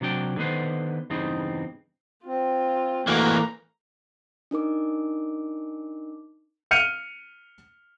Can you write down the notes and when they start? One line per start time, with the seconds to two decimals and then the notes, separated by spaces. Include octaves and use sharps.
0.01 C3 F#3 D4 G5
0.36 D3 D#3 B3 B4 C5
1.10 E2 G2 C#3 G3 C4 D#4
2.26 C4 F4
3.07 E3 A3 A#3 F#4 A#5
4.51 D4 D#4 A#4 D6
6.71 F6 G6 C#7 D#7 F7